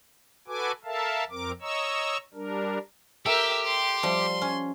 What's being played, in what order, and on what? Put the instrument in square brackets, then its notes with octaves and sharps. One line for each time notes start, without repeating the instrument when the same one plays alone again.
[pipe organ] F#4 A4 B4 G#5 D6
A4 A#4 E5 F5 A5
F2 C4 A#4 D6
C#5 D#5 A#5 C#6 E6
G3 D4 A#4
[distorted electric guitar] G4 [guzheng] A4 [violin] A#4 E5
[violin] C6
[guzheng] F3 G3
C#4